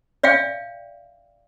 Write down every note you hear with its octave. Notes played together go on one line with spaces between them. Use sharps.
D5 E5 F5 G5